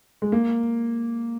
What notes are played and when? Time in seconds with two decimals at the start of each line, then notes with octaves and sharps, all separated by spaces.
0.22 G#3
0.32 A#3